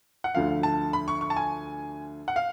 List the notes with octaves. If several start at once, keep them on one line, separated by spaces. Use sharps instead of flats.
F#5
D2 D3 F3 F5
A5
B5
C#6
C#6
A5
G#5
F#5
F5